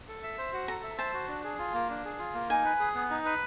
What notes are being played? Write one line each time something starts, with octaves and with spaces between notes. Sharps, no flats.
A4
E5
C5
F#4
A4 A#5
E5
C5 A5
F#4
D4
G#4
F4
A#3
D4
G#4
F4
A#3
D#4 G#5
B4
G#4
B3
D#4
B4